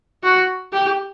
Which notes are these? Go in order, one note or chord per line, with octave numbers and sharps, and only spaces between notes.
F#4
G4